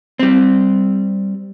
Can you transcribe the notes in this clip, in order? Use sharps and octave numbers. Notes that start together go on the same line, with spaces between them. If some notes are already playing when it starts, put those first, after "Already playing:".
G3 C4